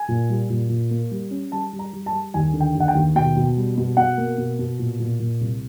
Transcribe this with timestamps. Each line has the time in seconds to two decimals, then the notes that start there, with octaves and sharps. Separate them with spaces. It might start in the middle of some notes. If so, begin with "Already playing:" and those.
Already playing: G#5
0.08 A#2
0.30 G3
0.50 A#2
0.69 A#2
0.91 A#3
1.11 G3
1.31 C#4
1.52 G3 A5
1.73 G3
1.79 A#5
1.93 G3
2.06 A5
2.13 G3
2.34 D#2 G#5
2.53 D3
2.60 G5
2.75 D#2
2.80 F#5
2.88 G5
2.95 D#2
3.15 B2 G5
3.36 B2
3.57 G3
3.77 B2
3.97 B2 F#5
4.18 A#3
4.38 B2
4.59 B2
4.79 A#2
5.00 A#2
5.20 A#2
5.41 C2